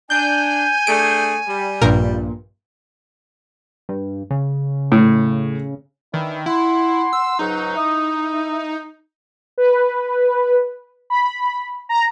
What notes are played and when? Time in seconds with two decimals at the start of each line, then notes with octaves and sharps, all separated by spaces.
0.10 D4 G#5 G6
0.87 A3 D4 G#4 D7
1.48 G3
1.82 A#1 G2 A#2 A#4
3.89 G2
4.31 C#3
4.92 A2
6.14 D#3 E3 D4 E4
6.46 E4 F#5 C6
7.13 E6
7.39 C#2 G#2 F#3 D#4
7.76 E4 E5 D#6
9.58 B4
11.10 B5
11.89 A#5